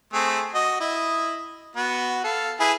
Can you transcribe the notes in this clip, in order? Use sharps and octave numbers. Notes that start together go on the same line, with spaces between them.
A3 C4 G#4
F#4 D#5
E4 D#5
B3 F#4
A4 F5
E4 G#4 B4